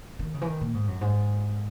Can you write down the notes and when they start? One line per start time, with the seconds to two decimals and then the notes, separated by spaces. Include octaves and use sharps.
0.19 D#3
0.34 C#3
0.41 E3
0.47 D#3
0.61 A#2
0.74 G#2
0.87 F#2
1.01 G#2